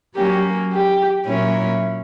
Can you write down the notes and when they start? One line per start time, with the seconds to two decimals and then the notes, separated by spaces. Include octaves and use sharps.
0.16 F#3 A#3 C#4 G4
0.72 G4
1.27 A#2 F#3 A#3 C#4 E4